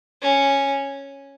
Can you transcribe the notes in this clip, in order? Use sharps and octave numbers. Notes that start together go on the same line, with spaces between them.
C#4